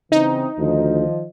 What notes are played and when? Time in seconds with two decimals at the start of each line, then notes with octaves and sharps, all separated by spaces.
0.12 C#3 E3 C4 D#4
0.58 D2 D#3 F3 D#5